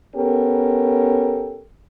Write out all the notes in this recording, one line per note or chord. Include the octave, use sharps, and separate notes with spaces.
B3 C#4 G4 A4 A#4